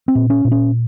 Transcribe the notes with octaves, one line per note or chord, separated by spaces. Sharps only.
C4
A#2
C#4
A#2
C#4